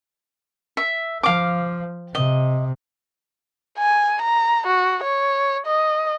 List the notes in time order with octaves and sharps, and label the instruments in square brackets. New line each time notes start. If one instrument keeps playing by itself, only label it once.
[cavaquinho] E5
[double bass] F3 [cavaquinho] F5 D6
[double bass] C3 [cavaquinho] D#5
[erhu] G#5
A#5
F#4
C#5
D#5